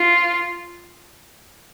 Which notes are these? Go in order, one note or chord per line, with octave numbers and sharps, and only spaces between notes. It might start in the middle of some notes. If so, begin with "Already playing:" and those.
Already playing: F4